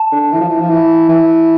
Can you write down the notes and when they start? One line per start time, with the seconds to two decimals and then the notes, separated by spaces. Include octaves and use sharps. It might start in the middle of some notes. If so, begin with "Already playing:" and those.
Already playing: A5
0.12 D3
0.32 E3
0.40 F3
0.50 E3
0.61 F3
0.70 E3
1.09 E3